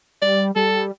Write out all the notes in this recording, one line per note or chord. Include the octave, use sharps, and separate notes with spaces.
G3 D5
G3 A4